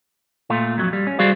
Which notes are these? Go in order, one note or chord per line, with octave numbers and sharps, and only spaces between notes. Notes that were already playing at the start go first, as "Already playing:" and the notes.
A#2 A3 F4
F2 F#3
G3
C#4
G3 F#4 G#4 C5 D5 F5